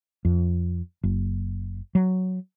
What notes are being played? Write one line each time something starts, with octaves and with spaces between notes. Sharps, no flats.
F2
F#1
F#3